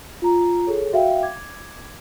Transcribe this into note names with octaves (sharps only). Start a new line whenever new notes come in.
F4 A#5
G#4 A4 C#5
F#4 E5 F5 G5
D6 G#6